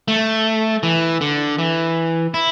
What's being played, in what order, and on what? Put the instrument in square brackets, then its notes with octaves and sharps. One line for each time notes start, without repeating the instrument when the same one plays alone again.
[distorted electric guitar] A3
E3
D3
E3
E4